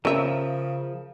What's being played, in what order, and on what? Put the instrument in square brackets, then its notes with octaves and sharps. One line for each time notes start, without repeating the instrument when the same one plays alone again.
[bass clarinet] C#3 [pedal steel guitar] F3 [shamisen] C#4 E5 [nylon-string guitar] A#4